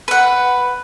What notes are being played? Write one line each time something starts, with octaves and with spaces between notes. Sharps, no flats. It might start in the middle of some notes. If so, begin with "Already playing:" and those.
B4 F#5